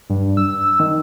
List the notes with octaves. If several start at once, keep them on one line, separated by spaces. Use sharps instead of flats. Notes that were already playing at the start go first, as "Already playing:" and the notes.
G2
E6
D#3